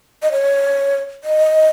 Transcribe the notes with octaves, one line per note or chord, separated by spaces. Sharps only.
D#5
C#5
D#5